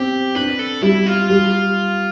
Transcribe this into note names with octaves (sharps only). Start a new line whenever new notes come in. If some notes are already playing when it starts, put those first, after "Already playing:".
Already playing: C4 G4
D4 B4
A4
G3 E4
F4
G3